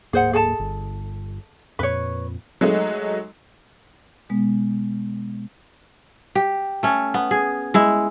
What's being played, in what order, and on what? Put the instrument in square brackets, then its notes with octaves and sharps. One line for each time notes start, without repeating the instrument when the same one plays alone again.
[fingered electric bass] D1 G#2 A#3 [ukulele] G#4 C5 F#5
[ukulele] G#4 A4 A5
[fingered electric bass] G1
[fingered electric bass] F2 A#2 [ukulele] B4 C#5
[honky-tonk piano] F#3 G#3 A3 D#4
[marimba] B2 G#3 B3
[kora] G4
A3 C#4
B3
G#4
G#3 E4